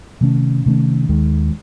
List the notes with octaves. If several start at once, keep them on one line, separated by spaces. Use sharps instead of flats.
C3 D#3 A3 C#4
C3 D#3 A3 C#4
D#2 D#3 G#3